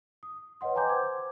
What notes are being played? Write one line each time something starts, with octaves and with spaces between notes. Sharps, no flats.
D#6
B4 C#5 D#5 F#5 C6
G5 G#5 A#5 C6 D6 G6
C5 D6 G#6